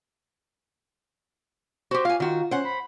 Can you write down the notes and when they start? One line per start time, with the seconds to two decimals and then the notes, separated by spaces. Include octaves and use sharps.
1.91 F#4 G4 C5
2.05 F4 F5 G#5
2.20 D#3 F4 F#4
2.51 C#4 C5 F#5
2.65 B5